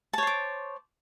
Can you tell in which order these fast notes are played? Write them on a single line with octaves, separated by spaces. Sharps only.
A5 C#5 C5 D6